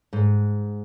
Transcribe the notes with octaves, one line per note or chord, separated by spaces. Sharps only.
G#2